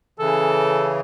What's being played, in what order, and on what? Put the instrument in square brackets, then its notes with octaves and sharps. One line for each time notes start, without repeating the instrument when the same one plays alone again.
[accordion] C#3 E3 [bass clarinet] A4